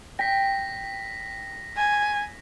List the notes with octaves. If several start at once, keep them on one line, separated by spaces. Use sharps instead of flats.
G5 A#6 B6
G#5